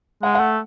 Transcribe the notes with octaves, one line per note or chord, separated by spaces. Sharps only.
G#3 F#5
F#5
A3